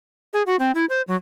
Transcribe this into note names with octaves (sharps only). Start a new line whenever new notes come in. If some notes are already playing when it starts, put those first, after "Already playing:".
G#4
F#4
C4
E4
C5
F#3